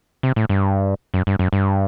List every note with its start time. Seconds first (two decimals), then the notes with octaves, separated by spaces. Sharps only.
0.23 C3
0.36 A2
0.49 G2
1.14 F#2
1.27 G2
1.39 F#2
1.53 G2